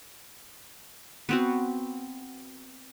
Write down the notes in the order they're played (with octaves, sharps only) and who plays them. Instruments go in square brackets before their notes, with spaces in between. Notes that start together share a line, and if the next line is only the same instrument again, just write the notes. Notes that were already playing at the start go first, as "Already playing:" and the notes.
[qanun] B3 C4 F#4